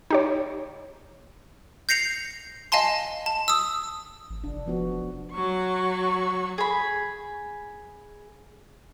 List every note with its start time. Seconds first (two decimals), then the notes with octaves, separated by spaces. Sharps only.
0.11 D#4 G4 C#5
1.89 G6 A#6 C7 C#7 F7
2.72 D#5 F5 G#5 A5 C6
3.26 A5
3.48 D#6 E6
4.30 A1
4.44 F1 D4
4.67 F3 B3 F#4
5.32 F#3 C#6
6.58 G#4 B5